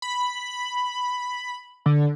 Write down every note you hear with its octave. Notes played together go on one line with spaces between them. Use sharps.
B5
D3